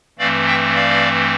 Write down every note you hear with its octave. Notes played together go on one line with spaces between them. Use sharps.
G2 E3 A3 C4 D5 F5
E5 G5
D5 F5